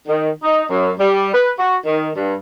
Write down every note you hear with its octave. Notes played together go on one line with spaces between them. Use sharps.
D#3
D#4
F#2
G3
B4
F#4
D#3
G2